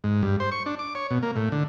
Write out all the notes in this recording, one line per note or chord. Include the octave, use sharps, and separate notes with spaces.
G#2
G2
C5
C#6
D4
D6
C#5
B2
A#3
A2
D3